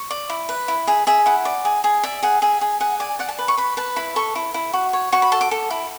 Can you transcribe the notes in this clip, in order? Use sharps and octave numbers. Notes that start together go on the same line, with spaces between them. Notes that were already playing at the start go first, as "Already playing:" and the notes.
Already playing: C#6
D5
E4
B4
E4
G#4 E5
G#4 E5
E4 F#5
D5
G#4
G#4
D5 E5
G#4 F#5
G#4 E5
G#4
G#4 F#5
D5 G#5
D5 F#5
A5
B4
C#6
B4 B5
B4 A5
E4 B5
A4 C#6
E4
E4
F#4
C#5
F#4 C#6
B5
A4 A5
D6
A4
E4